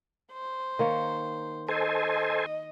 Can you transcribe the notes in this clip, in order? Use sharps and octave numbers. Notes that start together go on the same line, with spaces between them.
C5
D#3 A#3 C#5
A4 C5 D#5 G#5